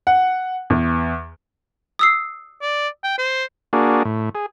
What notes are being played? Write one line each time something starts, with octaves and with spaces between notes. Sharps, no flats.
F#5
E2
D#6 E6 C7
D5
G5
C5
A#3 D4 F#4 G#4
A2
G#4